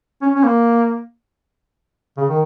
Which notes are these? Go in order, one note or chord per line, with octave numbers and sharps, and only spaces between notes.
C#4
C#4
A#3
C#3
D#3